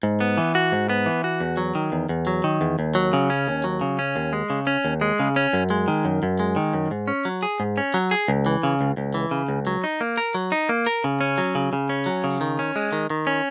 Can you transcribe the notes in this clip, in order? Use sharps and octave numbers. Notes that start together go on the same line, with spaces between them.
G#2
B3
E3
F#4
G#2
B3
E3
F#4
E2
F#3
D#3
E2
E2
F#3
D#3
E2
D#2
F#3
C#3
C#4
D#2
F#3
C#3
C#4
D#2
G#3
C#3
C#4
D#2
G#3
C#3
C#4
F#2
G#3
D#3
F#2
F#2
G#3
D#3
F#2
G#2
C#4
F#3
G#4
G#2
C#4
F#3
G#4
C#2
E3
C#3
C#2
C#2
E3
C#3
C#2
F#3
D#4
A#3
A#4
F#3
D#4
A#3
A#4
C#3
C#4
F#3
C#3
C#3
C#4
F#3
C#3
D#3
C#4
G#3
D#3
D#3
C#4